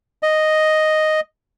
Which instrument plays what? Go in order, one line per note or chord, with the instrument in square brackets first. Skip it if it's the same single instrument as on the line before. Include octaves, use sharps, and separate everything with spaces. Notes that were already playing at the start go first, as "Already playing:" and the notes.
[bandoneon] D#5